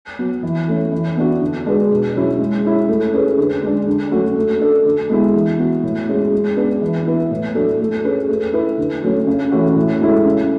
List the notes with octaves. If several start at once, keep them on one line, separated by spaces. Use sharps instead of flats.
F#3 B3
E3
A3 C#4
E3
B3 D4 F#4
D3
G#3 D4 G#4 B4
B2
F#3 C#4 E4 G#4
G#3
C#4 E4
A3
C#4 G#4 B4
D3
G#3 D4
D3
F#3 A3 C#4 F#4
A3
D4 A4
D3
G#3 B3 E4
E3
B3 F#4
A2
G#3 C#4 G#4
G#3
B3 D4 G#4 B4
E3
B3 E4 B4
A2
F#3 A3 D4 A4
A3
C#4 G#4 B4
A3
E4 B4
D3
F#3 A3 C#4
C#3
E3 A3 C#4 F#4
A2
G#3 C#4 E4 A4
C#3